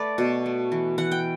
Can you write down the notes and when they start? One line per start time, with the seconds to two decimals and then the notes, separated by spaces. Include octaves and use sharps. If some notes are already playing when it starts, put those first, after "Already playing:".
Already playing: A3 B4 D5
0.18 B2
0.46 A3
0.72 E3
0.98 E3 F#5
1.11 G5